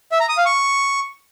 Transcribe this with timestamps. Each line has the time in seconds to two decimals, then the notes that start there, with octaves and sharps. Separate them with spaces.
0.12 E5
0.20 A#5
0.29 D#6
0.37 F5
0.46 C#6